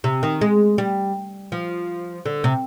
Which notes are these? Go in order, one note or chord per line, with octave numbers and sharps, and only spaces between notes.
C3
D#3
G#3
G3
F3
D3
C3